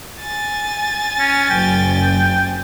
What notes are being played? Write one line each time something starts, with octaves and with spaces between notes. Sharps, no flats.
G#5 A6
C#4
F#1 G5